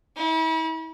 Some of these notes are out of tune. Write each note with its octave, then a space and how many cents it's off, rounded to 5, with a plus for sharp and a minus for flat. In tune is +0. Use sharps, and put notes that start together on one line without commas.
E4 -40